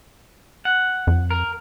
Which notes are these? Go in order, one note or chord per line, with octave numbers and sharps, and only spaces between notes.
F#5
F2
A#4